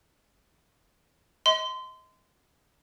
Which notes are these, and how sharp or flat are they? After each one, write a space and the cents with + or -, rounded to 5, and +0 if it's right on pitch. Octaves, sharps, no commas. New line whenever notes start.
D#5 +30 C6 -25